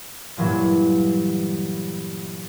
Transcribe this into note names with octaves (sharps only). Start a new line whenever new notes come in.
G2 A#2 E3 F#3